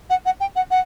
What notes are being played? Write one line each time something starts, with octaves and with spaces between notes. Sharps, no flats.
F#5
F#5
G5
F#5
F#5